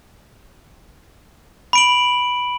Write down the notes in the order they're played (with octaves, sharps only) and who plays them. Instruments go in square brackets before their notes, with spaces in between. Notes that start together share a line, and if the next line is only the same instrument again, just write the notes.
[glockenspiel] B5 D7 F#7